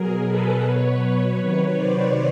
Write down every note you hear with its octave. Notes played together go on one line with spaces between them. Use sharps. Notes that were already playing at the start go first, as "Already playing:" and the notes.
Already playing: B2 F#3 G#4 A#4
A4 B4
B2 F#3 B4 C#5
C3 D#3 F#3
C5 D5